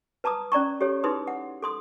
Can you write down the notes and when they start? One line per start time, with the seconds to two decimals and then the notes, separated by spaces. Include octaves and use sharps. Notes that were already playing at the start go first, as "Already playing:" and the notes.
0.24 B4 A5 A#5 D6 D#6
0.52 C#4 D5 A#5 C#6
0.81 G4 A4 C#5
1.04 D#4 E4 G#4 B4 C6 D#6
1.28 F#5
1.62 A4 C6 D#6